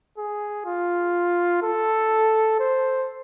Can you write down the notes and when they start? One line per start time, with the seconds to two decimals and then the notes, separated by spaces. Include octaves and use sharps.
0.18 G#4
0.66 F4
1.62 A4
2.60 C5